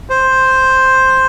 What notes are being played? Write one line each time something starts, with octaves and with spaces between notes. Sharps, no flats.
C5